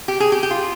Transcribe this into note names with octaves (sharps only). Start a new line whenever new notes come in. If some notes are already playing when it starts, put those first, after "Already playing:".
G4
G#4
G4
G4
F4